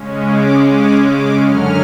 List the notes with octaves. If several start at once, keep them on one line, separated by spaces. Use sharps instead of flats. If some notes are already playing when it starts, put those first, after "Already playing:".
Already playing: C#3 G#3 C#4
D6
D6
D6
F#2 D3 F#3 C#4 F6